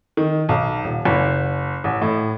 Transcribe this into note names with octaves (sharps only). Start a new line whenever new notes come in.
D#3
B1
D#1
F#1
A1
A2